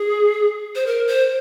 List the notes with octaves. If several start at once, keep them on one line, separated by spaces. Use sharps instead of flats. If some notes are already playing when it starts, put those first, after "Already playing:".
Already playing: G#4
C5
A#4
C5